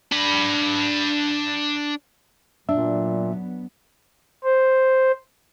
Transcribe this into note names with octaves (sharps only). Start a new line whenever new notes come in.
D4 B5
A#2 F#3 B3 D4 E5
C5